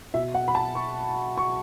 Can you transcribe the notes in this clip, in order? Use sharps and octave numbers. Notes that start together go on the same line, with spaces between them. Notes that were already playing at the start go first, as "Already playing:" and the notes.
B2 E5
F#5
B5
A5
C#6
C#6